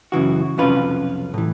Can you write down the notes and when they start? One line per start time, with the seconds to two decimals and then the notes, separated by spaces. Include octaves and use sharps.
0.12 F#2 C#3 E3 F#4
0.58 B1 F2 C3 C#4 F4 B4
1.34 A2 E3